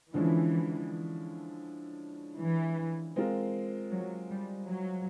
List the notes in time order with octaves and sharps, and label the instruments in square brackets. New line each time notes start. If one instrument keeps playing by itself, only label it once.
[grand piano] D3 F3 G#3 C#4 E4 [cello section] E3
[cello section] E3
[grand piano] G#3 C4 F4 A#4
[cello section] F#3
G3
F#3